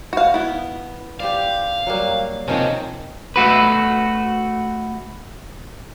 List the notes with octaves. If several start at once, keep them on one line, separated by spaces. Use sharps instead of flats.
F#4 F5
B3 E4
G4 C5 D5 F5
F#3 G3 A#3
C3 D#3 F3 C4 C#4
A3 F#4 B4